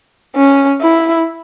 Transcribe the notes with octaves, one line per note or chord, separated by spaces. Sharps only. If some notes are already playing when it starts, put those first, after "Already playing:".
C#4
E4